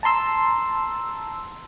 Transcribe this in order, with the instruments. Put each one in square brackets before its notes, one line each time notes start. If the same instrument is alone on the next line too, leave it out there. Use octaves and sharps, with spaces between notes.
[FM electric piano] A5 A#5 C6 E6